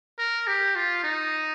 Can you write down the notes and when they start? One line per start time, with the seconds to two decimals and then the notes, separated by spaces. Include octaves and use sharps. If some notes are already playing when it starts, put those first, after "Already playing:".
0.18 A#4
0.47 G4
0.76 F4
1.04 D#4